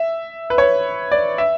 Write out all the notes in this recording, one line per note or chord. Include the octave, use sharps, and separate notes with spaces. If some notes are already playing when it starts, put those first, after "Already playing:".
Already playing: E5
B4
C#5
D5
E5